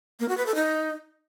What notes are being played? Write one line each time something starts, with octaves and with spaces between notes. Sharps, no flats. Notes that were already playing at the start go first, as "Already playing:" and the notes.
A#3
F#4
B4
A4
D#4